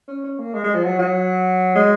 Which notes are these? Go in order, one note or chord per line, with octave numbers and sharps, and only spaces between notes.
C#4
C#4
A#3
G#3
G#3
F3
F#3
F#3
G#3